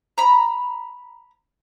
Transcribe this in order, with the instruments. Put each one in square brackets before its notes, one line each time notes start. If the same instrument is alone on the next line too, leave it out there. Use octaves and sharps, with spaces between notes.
[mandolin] A#5 B5